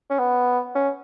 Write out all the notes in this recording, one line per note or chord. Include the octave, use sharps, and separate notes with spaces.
C#4
B3
C#4